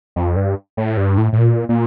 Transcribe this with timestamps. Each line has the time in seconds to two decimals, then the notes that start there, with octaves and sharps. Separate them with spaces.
0.16 F2
0.36 G2
0.77 A2
0.97 G2
1.18 A2
1.33 A2
1.38 A#2
1.69 A#2